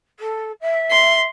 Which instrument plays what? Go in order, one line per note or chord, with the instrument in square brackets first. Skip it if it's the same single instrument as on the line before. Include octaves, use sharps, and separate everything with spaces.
[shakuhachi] A4
E5
[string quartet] C6